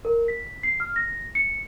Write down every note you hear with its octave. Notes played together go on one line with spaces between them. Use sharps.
A#4
B6
C7
F6
A#6
C#7